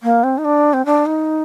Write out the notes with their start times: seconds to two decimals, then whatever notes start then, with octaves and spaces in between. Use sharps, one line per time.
0.03 A#3
0.23 C4
0.38 D#4
0.45 D4
0.73 C4
0.85 D4
1.06 D#4